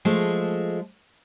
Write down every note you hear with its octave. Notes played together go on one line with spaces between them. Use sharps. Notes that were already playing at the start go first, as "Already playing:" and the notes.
F3 G#3 A3